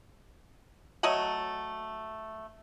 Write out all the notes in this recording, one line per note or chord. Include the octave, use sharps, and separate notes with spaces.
F#3 A3 D#5 F#5